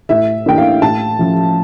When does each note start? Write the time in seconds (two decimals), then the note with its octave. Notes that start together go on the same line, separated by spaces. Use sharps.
0.09 A2 E5
0.46 E3 A#3 D4 G5
0.58 F5
0.82 A2 A5
1.18 F3 C#4 E4